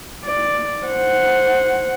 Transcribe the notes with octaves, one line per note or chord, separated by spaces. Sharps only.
D5
C5 F#5